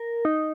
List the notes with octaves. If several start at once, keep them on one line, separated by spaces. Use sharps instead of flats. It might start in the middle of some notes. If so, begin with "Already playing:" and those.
Already playing: A#4
D#4